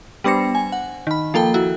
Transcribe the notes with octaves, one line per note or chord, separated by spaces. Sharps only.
G3 B3 D4 C5 A#6 C#7
G#5
F#5
D#3 B5
F3 A#3 A4 G5
E4 F#4